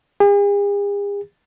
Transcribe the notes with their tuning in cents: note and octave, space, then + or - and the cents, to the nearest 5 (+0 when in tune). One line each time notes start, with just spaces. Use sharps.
G#4 -45